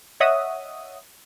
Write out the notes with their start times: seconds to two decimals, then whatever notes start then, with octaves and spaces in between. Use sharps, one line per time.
0.20 C#5 D#5 E5 F#5 D#6